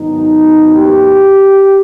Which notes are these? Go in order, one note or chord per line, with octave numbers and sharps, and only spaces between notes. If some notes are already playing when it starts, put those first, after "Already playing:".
Already playing: G#2 D#3 F#3 B3 D#4
G4